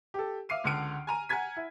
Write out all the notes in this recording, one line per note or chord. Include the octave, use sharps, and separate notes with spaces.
G4 A4
E5 F5 D6 C7 D#7
C#2 D3 F#5 F6 D7
G#5 A#5 D#7
F#5 G#5 A#5 G#6 B6
E4